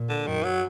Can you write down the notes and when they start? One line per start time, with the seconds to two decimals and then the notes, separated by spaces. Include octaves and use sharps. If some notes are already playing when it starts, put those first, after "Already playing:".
Already playing: A#2
0.09 D3
0.27 F#2 D#3
0.44 F#3